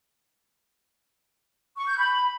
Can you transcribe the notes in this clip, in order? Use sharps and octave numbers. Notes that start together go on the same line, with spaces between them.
C#6
G6
B5